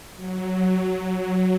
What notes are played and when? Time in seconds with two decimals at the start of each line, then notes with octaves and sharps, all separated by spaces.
0.15 F#3